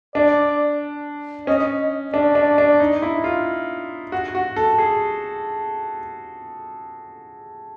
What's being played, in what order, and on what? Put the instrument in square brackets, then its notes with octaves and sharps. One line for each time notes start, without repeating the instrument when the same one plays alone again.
[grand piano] D4 [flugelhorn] D5
[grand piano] C#4 [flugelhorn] D#5
[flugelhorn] D#5
[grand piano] D4 [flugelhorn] D5
[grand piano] D4
D4
D#4
E4
F4
F#4
F#4
A4
G#4